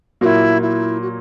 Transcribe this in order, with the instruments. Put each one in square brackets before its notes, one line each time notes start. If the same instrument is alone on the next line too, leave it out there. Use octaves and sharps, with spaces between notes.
[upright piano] A#2 F#3 A#3 [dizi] E4 F#4
[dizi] E4
F#4